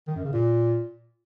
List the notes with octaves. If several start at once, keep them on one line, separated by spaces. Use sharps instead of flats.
D#3
F#2
C#3
A#2